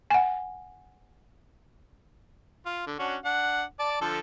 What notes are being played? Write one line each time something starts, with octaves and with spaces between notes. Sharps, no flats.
F#5 G#5
F4
D3
C#4 D4 F#4
D4 F#5
D5 A5
D3 F3 A4